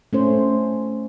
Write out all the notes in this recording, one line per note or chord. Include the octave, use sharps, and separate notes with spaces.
A3 C#4 C5